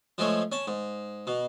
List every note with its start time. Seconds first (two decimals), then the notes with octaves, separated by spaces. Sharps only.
0.18 F3 G#3 A3 C#5
0.52 C#4 A5
0.67 G#2
1.27 B2